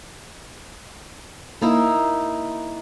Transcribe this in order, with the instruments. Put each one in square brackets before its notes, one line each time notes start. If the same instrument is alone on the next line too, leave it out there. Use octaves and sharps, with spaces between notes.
[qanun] A#3 D#4 E4